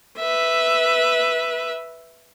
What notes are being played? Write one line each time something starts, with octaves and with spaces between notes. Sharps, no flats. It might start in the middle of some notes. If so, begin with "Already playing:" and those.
B4 E5